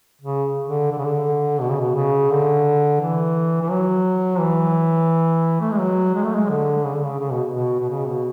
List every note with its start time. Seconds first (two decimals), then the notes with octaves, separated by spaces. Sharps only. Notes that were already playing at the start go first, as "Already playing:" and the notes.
0.21 C#3
0.67 D3
0.91 D3
0.98 C#3
1.05 D3
1.61 B2
1.71 C#3
1.80 B2
1.95 C#3
2.30 D3
3.01 E3
3.62 E3
3.71 F#3
4.40 E3
5.61 A3
5.71 G#3
5.80 F#3
6.15 G#3
6.23 A3
6.33 G#3
6.49 D3
6.85 C#3
6.94 D3
7.04 C#3
7.19 C#3
7.31 B2
7.52 B2
7.79 B2
7.90 C#3
8.07 B2